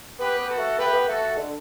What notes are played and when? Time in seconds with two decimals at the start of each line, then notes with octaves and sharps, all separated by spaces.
0.19 B3 G4 B4
0.39 B3
0.49 F#4 A4
0.58 A3
0.78 B3 G4 B4
0.86 A3
0.93 B3
1.08 A3 F#4 A4
1.37 D3